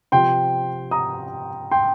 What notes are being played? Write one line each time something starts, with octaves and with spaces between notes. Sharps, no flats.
C3 F3 C4 G5 C6
A#5 D#6
G5 C6